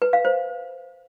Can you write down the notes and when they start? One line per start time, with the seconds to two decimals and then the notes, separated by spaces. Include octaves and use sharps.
0.02 B4
0.13 F5
0.25 C5